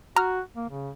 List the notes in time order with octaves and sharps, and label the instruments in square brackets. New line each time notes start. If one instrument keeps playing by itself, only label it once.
[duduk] F#4 [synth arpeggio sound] A#5 F6
[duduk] A#3
C#3